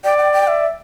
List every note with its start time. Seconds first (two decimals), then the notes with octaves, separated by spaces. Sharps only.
0.04 D5 G5
0.18 G5
0.33 G5
0.47 E5